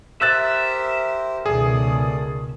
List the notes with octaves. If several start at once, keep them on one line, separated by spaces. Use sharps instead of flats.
G4 A#4 C5 E5 E6 F#6 A6
C#2 B2 D#3 G#4 A4 D5 D#6